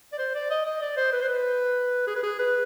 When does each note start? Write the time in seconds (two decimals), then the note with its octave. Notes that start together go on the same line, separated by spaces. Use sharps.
0.12 D5
0.18 C5
0.35 D5
0.50 D#5
0.66 D#5
0.82 D5
0.97 C5
1.13 B4
1.21 C5
1.28 B4
2.07 G#4
2.16 B4
2.23 G#4
2.39 B4